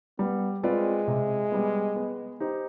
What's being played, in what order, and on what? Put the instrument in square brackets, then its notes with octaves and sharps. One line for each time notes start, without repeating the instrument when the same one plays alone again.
[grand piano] G3 [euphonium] B3
[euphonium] G#3 [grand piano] C4 F4 B4 D5
[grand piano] C3
G3 B3
B3
D#4 G4 C5